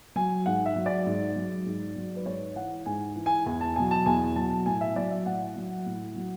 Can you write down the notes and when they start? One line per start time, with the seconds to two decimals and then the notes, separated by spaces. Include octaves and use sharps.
0.16 F#3 G#5
0.46 G#2 F#5
0.66 E5
0.76 F#3
0.86 D5
1.06 G#2
1.36 F#3
1.66 G#2
1.96 F#3
2.16 B4
2.26 G#2 C#5
2.56 E3 F#5
2.86 G#2 G#5
3.16 E3
3.26 G#5
3.46 E2 G#5
3.61 A5
3.76 B2 F#3 G#5
3.91 A5
4.06 E2 G#5
4.36 B2 F#3 A5
4.66 A2 G#5
4.81 E5
4.96 F#3 D5
5.11 E5
5.26 A2 F#5
5.56 F#3
5.86 A2
6.16 F#3